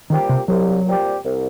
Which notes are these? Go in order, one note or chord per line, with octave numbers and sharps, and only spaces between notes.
A#2 D#3 G3 C4 G4
C3
C2 F#3
A#2 G3 C4 G4
C2